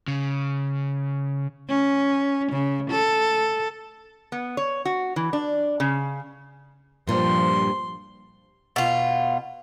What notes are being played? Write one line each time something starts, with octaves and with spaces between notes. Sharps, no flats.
C#3
C#4
C#3
A4
B3
C#5
F#4
E3
D4
C#3
G2 A#2 F3 G3 C6
B2 F4